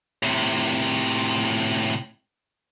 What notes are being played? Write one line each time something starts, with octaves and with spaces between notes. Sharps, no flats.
A2 C3